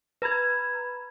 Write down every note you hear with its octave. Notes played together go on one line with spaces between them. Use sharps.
B4 A#5 B5 G#6